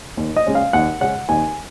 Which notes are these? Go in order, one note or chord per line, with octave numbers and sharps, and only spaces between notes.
D#2
D#5
C#3 G#3 C#4
F5
D#2 F#5
C#3 G#3 C#4 F#5
D#2 G#5